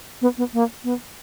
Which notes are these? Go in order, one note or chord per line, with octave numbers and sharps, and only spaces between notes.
B3
B3
A#3
B3